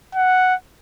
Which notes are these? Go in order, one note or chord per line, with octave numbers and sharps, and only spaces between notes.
F#5